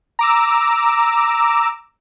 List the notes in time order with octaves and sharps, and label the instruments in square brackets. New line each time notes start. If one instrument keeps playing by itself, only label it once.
[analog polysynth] A#5 D6 E6